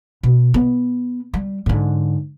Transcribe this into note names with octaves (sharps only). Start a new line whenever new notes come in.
B2
B3
G3
G#2 D3